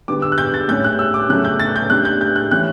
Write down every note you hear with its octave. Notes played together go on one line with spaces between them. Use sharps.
D3 G3 B3 D6
E6
F#6
G6
A6
A2 G3 C#4 G6
F#6
E6
D6
C#3 F#3 A3 C#4 F#6
G6
A6
G6
A2 G3 D4 F#6
G6
G6
F#6
A2 E3 G3 C#4 F#6